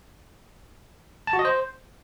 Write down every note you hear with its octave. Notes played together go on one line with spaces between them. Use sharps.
A5
F#4
D#5
C5